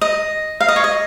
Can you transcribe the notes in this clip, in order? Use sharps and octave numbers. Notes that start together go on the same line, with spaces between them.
D#5
F5
D#5
C#5
D#5